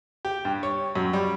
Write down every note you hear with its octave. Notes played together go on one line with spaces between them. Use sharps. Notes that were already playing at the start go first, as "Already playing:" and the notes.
G4
G2
C#5
F#2
G3